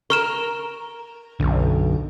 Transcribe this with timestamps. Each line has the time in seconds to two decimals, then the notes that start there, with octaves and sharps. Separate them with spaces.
0.10 A#4 C#6 F6 E7
1.40 B1 F#2 D3